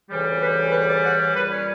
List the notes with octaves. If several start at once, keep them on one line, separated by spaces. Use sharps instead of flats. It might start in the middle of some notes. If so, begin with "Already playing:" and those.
D2 C#3 E3 G3
B4
B4
D5
F#5
C#5
A#2 G3 B4
C#4